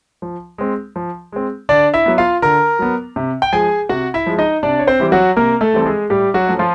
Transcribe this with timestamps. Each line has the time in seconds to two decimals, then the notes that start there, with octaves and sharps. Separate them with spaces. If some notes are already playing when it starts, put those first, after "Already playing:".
0.22 F3
0.58 G#3 C4
0.96 F3
1.32 G#3 C4
1.69 D3 D4 D5
1.94 E4 E5
2.06 F#3 B3
2.18 F4 F5
2.42 D3 A#4 A#5
2.79 F#3 B3
3.16 C3
3.42 G5
3.53 F3 G#3 G#4 G#5
3.89 C3 F#4 F#5
4.14 E4 E5
4.26 F3 G#3
4.38 D#4 D#5
4.63 C3 D4 D5
4.79 C#5
4.87 C4 C5
5.00 E3 G3 C4 G4
5.12 F#3 F#4
5.37 C3 A#3 A#4
5.61 A3 A4
5.74 E3 G3 C4
5.82 A4
5.86 G#3 G#4
6.10 A2 G3 G4
6.34 F#3 F#4
6.47 F3 A3 C#4
6.59 F3 F4